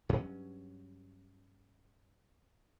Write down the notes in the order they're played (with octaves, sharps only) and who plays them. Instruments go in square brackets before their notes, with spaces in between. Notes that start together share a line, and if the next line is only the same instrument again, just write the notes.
[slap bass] G2 F#3 C#4